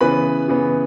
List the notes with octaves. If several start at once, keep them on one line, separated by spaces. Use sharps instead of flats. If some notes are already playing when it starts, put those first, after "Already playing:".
C#3 E3 B3 B4 B5
C#3 E3 B3